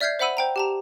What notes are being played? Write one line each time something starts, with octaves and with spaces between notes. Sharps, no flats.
D5 E5 F6 G6 G#6 C7
C5 E5 F#5 B5 E6 D#7
C5 G5 A#5
G4 A5 A#5